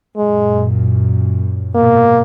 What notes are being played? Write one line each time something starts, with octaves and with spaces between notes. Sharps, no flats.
F#2 A#2 G#3
G#2 B2 A#3